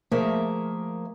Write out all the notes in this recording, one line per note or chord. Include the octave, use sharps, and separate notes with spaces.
F3 A3 A#3 G#4 A#4 E5